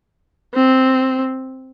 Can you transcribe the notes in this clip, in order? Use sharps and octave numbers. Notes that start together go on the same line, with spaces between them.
C4